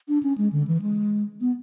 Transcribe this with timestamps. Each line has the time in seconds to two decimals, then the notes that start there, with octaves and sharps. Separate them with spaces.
0.08 D4
0.23 C#4
0.38 G#3
0.53 D3
0.67 E3
0.82 G#3
1.41 B3